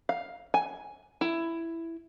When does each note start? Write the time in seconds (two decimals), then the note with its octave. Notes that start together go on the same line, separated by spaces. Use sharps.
0.09 F5
0.54 G#5
1.21 E4